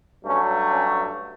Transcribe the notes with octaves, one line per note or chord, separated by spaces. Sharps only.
G2 F#3 A3 C#4
C#4